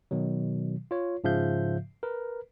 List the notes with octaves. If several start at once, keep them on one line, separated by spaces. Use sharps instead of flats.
B2 D#3 F#3
F4 C#5
G#2 C#3 F3 E5 F5 G6
A#4 B4